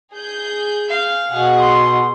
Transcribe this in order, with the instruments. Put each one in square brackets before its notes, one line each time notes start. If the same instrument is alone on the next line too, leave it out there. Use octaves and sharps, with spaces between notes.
[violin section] G#4 G6
[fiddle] F5
[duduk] B2 [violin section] G#4 F#5
[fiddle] C6